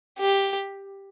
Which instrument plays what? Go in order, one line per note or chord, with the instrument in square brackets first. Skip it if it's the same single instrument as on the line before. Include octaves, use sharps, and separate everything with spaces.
[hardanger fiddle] G4